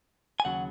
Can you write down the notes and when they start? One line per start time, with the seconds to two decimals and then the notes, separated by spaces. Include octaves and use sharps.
0.40 G#5
0.45 D#2 C#3 F#3 F#5